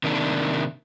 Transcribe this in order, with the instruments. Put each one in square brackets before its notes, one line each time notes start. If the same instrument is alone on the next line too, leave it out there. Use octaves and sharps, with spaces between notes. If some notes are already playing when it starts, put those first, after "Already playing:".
[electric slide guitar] C3 D#3 A#3 D4